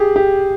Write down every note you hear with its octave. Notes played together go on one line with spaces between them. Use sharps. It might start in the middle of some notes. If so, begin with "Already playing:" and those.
Already playing: G4 G#4
G4